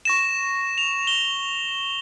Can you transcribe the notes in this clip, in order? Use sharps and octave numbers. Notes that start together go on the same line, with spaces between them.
C#6 A#6 E7
F7
G7